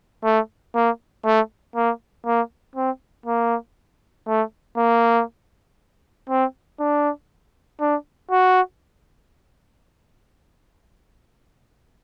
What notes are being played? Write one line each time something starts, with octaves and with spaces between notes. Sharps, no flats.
A3
A#3
A3
A#3
A#3
C4
A#3
A3
A#3
C4
D4
D4
F#4